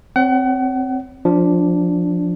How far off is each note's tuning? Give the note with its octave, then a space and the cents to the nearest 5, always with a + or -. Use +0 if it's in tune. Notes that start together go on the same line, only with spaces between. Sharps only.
C4 +0 C#5 +25 F#5 +35
F3 +10 D4 -5